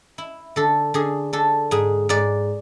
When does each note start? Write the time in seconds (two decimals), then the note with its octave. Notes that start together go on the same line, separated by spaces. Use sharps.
0.18 E4
0.56 D3 A4
0.94 D3 G#4
1.33 D3 A4
1.71 G#2 G#4
2.09 G#2 D5